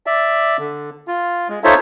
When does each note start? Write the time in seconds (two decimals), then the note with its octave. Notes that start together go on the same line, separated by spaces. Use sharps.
0.07 D5 E5
0.58 D3
1.08 F4
1.49 G#3
1.64 D#4 F4 A4 C5 C#5 E5